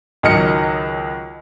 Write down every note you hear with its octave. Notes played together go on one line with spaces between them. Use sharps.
C#2 D#3 F#3 D#5 F6 C#7